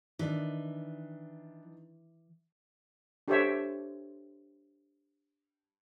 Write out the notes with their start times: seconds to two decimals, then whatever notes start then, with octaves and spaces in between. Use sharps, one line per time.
0.19 D#3 E3 D4
3.28 D4 G4 A4 C5 C#5 E5